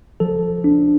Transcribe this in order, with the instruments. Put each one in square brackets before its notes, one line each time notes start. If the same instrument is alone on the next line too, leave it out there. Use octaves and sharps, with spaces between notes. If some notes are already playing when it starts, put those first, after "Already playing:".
[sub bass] F3 [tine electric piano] A4
[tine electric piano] D4